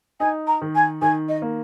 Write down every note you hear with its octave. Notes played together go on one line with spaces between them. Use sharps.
D#4 G#5
A#5
D#3
G#5
D#3 G#5
D#5
A#3